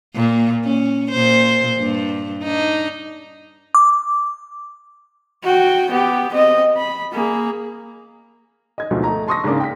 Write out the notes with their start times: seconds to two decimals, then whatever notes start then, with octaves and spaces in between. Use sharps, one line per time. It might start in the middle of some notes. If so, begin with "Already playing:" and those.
0.15 A#2
0.65 C#4
1.12 A#2 C5
1.79 G2
2.43 D4 D#4
3.75 D6
5.43 F#4 G5
5.91 B3 G4
6.33 C4 D#5
6.77 B5
7.12 A#3 G#4
8.78 D#5 G#6
8.91 D2 G#2 B2 F3 F#3
9.04 A3 D#5 A#5
9.28 A5 C6 C#6 D#6 E6 A#6
9.44 G#2 C#3 A#3 D4 D6
9.60 G5 B6